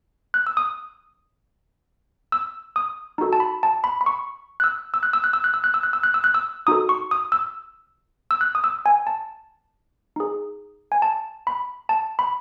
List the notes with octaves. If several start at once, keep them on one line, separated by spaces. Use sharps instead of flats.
F#6
E6
D#6
E6
D#6
D#4 F#4 A4
A5
B5
A5
B5
B5
C#6
F#6
E6
E6
F#6
E6
F#6
E6
F#6
E6
F#6
E6
F#6
E6
F#6
E6
F#6
E6
D#4 F#4 A4 D#6
C#6
D#6
E6
E6
F#6
D#6
E6
G#5
A5
D#4 G#4
G#5
A5
B5
A5
B5